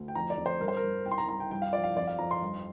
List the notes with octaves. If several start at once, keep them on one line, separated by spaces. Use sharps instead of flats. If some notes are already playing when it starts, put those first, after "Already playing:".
Already playing: D2
G5
F2 A#5
D5
F2
C5
G2 A#4
C5
A#4
G2
C2 G5
C6
A#5
C2 A#5
G5
G2 G5
F5
F3 D5
F5
F2 D5
F5
F2 A#5
C6
G2